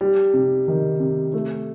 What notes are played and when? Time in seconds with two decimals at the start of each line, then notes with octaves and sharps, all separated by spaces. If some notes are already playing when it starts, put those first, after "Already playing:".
0.01 G3
0.34 C3
0.68 D#3
1.00 C3
1.33 A3